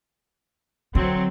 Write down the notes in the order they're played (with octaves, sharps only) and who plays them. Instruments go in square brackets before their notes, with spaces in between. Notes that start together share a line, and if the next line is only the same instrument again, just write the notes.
[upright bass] D3 [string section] F#3 C4